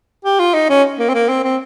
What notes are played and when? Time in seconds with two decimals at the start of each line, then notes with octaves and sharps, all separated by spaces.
0.25 G4
0.39 F4
0.54 D#4
0.69 C#4
0.99 A#3
1.09 C4
1.14 A#3
1.29 C4
1.44 C4